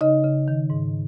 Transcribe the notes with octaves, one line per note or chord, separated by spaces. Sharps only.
C#3 D#4 D#5
C#3
D#3
G#2